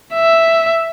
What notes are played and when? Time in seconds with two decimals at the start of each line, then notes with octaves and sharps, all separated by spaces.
0.14 E5